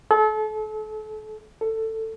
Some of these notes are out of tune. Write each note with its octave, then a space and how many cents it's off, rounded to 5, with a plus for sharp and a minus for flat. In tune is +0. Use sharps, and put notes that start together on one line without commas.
A4 -35
A4 +15